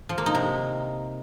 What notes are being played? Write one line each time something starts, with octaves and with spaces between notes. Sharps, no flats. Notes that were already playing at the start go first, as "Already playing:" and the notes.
F3
A#3
D#4
C3